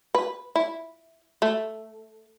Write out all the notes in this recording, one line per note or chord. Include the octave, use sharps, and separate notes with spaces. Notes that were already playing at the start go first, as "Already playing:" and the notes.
B4
E4
A3